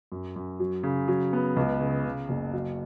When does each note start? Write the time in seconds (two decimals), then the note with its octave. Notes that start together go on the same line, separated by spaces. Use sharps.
0.12 F#2
0.36 F#2
0.60 F#3
0.83 C#3
1.08 F#3
1.33 B3
1.56 C#2
1.81 C#3
2.05 C#3
2.29 F#1
2.53 F#3